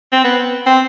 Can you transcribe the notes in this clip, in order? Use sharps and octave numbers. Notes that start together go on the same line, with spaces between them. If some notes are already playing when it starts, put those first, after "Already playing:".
C4
B3
C4